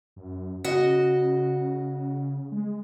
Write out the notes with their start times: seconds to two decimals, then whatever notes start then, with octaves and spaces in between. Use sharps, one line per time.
0.16 F#2
0.64 C#3 F#4 D#5
2.52 G#3